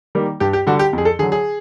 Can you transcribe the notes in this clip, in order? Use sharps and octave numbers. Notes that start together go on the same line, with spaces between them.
D#3 G3 A#3
G2 G4
G4
D3 G3 F#4
G4
F2
G#4
A4
D3 F#3 G#4
G#4